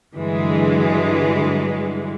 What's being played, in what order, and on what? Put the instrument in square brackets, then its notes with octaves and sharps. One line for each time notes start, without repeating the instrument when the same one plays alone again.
[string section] G2 D3 E3 F#3 G#3